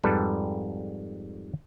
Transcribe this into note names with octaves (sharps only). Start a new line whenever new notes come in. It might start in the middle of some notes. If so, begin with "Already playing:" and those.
F2 G#2 G3 A4 B4 A5